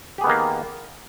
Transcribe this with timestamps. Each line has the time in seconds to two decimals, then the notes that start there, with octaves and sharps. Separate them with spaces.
0.18 G4
0.21 G#4
0.24 B3
0.27 D#3
0.29 A#3